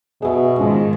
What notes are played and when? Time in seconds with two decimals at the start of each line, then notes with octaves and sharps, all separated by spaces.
0.22 B2 G#4 D#5 E5
0.59 G#2 D#3 F3 G#3 C#4